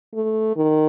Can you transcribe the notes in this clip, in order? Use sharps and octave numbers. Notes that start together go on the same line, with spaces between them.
A3
D#3